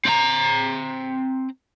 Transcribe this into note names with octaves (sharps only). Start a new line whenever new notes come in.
C4 A#5